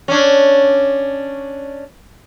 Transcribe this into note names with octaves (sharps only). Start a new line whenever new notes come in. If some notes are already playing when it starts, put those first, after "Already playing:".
C#4 D4